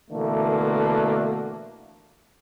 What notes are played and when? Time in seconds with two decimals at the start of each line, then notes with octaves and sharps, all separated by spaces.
0.11 B2 D3 E3 A3 A#3